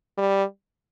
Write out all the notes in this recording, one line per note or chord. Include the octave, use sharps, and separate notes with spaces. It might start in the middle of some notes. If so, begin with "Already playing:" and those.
G3